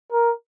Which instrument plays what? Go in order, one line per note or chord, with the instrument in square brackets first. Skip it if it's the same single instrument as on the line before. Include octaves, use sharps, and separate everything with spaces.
[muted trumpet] A#4